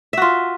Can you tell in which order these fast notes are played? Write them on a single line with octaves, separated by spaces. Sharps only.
E5 F#4 F4